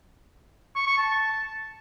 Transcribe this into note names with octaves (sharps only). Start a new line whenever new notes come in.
C#6
C#6
A5